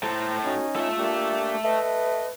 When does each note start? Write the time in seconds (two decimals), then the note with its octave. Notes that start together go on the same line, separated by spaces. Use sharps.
0.03 A2 A4 C5 A#5
0.45 C#4 D#4 F#4
0.76 F4 A4 E5
0.98 A#3 D4 G4
1.64 A3 B4 D#5